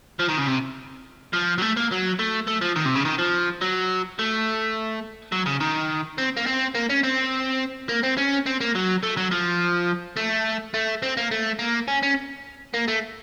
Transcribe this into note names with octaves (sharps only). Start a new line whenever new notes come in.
F3
D#3
C#3
C3
F3
F#3
A3
A#3
F#3
A3
A3
F3
D#3
C3
C#3
D#3
F3
F#3
A3
F#3
C#3
D#3
C4
A#3
C4
A#3
C#4
C4
A#3
C4
C#4
C4
A#3
F#3
A3
F#3
F3
A3
A3
C4
A#3
A3
A#3
C#4
C#4
A#3
A3